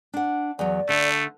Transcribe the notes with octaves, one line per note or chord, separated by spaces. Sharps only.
D4 F#5
E2 F#3 D5
D3 A3